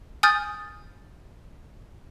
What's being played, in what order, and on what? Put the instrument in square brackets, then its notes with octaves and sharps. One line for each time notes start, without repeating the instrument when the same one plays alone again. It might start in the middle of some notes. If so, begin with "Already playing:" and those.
[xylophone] G#5 D#6 F6 G6 A6